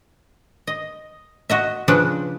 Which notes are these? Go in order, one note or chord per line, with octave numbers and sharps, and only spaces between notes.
D#5
F#4 D#5 E5
C#3 F3 D4 B4